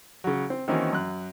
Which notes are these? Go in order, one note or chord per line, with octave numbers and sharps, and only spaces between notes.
C#3 F#3
C4
D#3 E3 A#3 C4 C#4 F#4
F#2 F#6